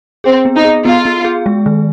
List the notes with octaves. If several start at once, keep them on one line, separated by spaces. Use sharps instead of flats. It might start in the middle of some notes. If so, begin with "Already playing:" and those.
C4 G#4
B3
D#4
G#4
B3 F4
B3
G#4
G#3
D#3